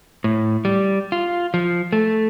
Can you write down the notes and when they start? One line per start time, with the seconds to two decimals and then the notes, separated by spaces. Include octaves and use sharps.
0.24 A2
0.65 G3
1.12 F4
1.54 F3
1.93 A3